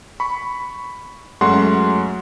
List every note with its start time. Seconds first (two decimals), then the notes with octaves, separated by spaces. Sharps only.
0.20 B5 C#6
1.41 F#2 G#3 A3 F#4 F#5 C6